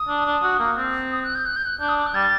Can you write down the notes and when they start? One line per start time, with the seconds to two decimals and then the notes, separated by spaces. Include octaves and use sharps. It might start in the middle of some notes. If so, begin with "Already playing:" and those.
Already playing: D#6
0.08 D4
0.25 D4
0.43 F#4
0.59 A#3
0.77 C4
1.12 D#6
1.24 F#6
1.35 G6
1.46 F#6
1.56 G6
1.66 F#6
1.80 D4 G6
1.89 D#6
1.98 D6
2.07 F#6
2.14 G3 A6